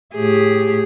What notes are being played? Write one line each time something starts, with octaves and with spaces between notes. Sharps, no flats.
A2 G4 G#4